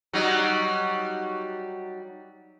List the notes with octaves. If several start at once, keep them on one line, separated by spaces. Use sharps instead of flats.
F#3 G3 D#4